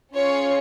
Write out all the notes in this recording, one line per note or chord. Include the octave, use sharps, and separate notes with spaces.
C#4 F4 G#4 C#5